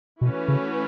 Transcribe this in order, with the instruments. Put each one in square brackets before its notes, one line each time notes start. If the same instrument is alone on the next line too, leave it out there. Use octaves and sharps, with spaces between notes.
[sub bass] B2 [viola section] E3 A3 C#4 F#4 B4
[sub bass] C#3